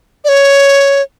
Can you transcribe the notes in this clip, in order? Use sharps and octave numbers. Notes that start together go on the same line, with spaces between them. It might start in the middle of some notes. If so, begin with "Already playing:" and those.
D5
C#5